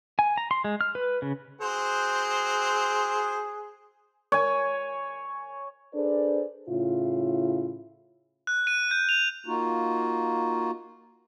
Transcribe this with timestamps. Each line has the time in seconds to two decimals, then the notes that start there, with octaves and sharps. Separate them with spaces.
0.19 G#5
0.37 A#5
0.51 C6
0.64 G#3
0.81 F6
0.95 B4
1.22 C#3
1.61 C4 F#4 G#4 C5
4.32 C#5 G#5
5.94 D4 G#4 A4 B4 C5 D5
6.69 A2 C#3 E4 F4
8.47 F#6
8.67 D#7
8.91 G6
9.09 F7
9.47 A#3 D#4 F4 F#4